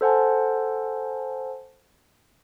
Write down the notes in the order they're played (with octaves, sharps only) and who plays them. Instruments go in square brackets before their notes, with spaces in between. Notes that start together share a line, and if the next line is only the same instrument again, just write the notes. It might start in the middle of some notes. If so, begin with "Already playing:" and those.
[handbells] A4 C5 F#5 G#5 A5